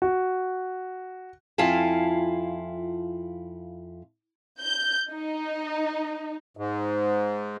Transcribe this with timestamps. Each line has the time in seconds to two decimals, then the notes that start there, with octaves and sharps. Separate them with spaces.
0.02 F#4
1.58 F2 E4 F4 F5 G#5 A5
4.60 G6
5.13 D#4
6.57 G#2